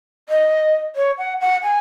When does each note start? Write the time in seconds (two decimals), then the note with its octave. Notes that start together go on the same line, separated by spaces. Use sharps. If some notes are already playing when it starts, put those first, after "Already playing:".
0.29 D#5
0.96 C#5
1.18 F#5
1.41 F#5
1.63 G#5